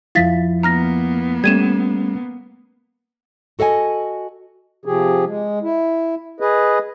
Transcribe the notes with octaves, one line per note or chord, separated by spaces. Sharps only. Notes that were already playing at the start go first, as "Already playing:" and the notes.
F2 F3 E4 F5 A6 B6
A#3 B3 A#5 F6 A#6
G3 A3 C#4 G#6 D#7 E7
F#4 A4 D#5 F5 G#5
C3 F3 G4 G#4
G#3
E4
G#4 B4 D#5